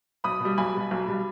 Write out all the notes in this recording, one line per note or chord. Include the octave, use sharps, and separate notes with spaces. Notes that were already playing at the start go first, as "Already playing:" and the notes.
B1 B5 D#6
B2 G3
B1 G#5 B5
B2 G3
B1
B2 G3